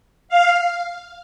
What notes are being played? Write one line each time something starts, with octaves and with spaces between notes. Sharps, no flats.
F5